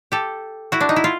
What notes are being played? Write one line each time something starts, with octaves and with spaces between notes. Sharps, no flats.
G4 A4
E4 F#4
D4
D#4
E4
F4